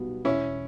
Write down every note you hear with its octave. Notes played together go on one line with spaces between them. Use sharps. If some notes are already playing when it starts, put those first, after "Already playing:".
Already playing: B1 B2 G3 B3
E1 C#4 E4